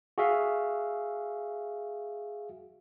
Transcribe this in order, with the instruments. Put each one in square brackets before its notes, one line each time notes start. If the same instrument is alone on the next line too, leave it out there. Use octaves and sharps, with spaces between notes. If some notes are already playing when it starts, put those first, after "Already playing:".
[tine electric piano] F#4 G#4 E5 F5